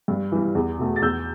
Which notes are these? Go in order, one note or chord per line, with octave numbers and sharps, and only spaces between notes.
G2
E3 G3
E2
B2 A3
A6
E2 E6 G6